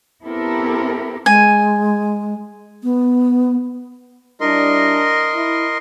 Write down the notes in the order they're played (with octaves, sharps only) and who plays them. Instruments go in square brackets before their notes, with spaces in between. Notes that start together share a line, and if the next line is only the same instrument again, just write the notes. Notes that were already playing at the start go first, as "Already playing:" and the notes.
[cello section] B3 C4 E4 G4 A4 A#4
[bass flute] G#3 [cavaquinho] G#5
[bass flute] B3
[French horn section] G3 D4 E4 [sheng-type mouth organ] A#4 D#5 C6
[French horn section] E4